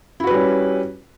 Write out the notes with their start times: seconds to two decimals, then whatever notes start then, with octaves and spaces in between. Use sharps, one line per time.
0.20 E4
0.24 F#4
0.27 B4
0.31 G3
0.34 C#4